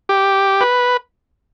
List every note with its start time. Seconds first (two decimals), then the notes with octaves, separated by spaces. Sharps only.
0.09 G4
0.61 B4